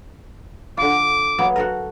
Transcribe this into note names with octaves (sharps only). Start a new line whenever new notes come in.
D3 F4 D6
F#3 A#3 B3
F#4 A4 A#4